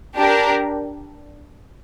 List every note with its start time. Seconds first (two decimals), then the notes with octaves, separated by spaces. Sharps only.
0.18 D4 G4 A#4